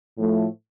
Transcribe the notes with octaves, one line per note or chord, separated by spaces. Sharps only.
A2 F3 A3